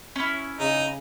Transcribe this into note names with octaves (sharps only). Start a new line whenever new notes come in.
C#4 E4
C#3 D#4